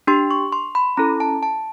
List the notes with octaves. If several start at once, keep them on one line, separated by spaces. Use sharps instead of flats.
D4 G4 C6
C#6
C6
B5
C#4 E4 A4 A#5
A5
A5